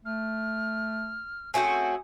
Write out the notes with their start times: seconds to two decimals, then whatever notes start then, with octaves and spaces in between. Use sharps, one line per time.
0.05 A3 F6
1.54 A3 C4 C#4 F#4 G#4 D#6